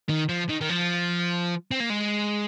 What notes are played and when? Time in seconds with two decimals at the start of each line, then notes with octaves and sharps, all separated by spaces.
0.09 D#3
0.29 F3
0.49 D#3
0.61 D#3
0.70 F3
1.71 C4
1.80 A#3
1.90 G#3